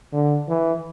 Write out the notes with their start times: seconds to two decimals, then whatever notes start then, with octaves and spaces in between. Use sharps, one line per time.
0.13 D3
0.48 E3